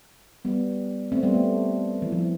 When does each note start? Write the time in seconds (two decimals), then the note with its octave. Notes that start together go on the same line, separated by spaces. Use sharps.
0.45 G3 B3
1.12 A3 C4
1.23 G3 B3
1.34 A3
2.02 E3
2.12 F3